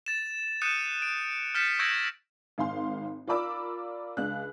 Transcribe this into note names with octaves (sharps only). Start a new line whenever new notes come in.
A6 E7
D#6 F#6 G6 C#7 D#7 E7
D7
F6 G6 A6 B6 C#7 E7
C#6 E6 G6 G#6 A#6 D7
G#1 F5 C6
F4 A#4 D5 B5 D6 E6
C#2 D4 F#6